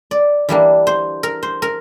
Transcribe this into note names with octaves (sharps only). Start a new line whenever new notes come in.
D5
E3 G3 A#3 D4
C5
A#4
C5
A#4